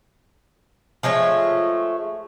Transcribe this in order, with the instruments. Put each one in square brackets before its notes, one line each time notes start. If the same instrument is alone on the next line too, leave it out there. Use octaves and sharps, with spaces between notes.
[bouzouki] F3 G#3 A3 C#5